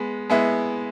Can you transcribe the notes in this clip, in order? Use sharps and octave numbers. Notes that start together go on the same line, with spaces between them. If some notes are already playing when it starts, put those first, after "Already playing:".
Already playing: G#3 B3
G#3 B3 E4